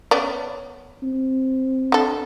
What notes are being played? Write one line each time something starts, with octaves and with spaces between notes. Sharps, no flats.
B3 C#4 D5
C4
D3 A4